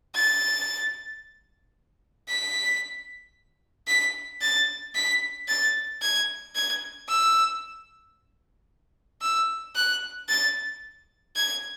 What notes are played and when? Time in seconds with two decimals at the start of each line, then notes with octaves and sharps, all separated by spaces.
0.15 A6
2.29 B6
3.88 B6
4.42 A6
4.95 B6
5.48 A6
6.02 G#6
6.55 G#6
7.09 E6
9.22 E6
9.76 F#6
10.28 A6
11.36 G#6